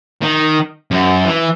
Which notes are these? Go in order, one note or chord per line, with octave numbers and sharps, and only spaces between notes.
D#3
F#2
E3